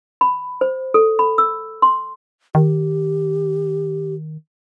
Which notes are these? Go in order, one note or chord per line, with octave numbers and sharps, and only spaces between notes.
B5
C5
A4
B5
E6
C6
D#3 G4